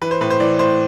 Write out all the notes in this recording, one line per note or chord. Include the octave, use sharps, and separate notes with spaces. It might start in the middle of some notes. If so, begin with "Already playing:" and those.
E3 B4
C5
A2 B4
C5
E3 D5
A2 C5